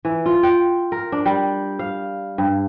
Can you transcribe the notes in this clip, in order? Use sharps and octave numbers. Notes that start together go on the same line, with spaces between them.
E3
F4
G5
A#4
D4
G3
F5
G2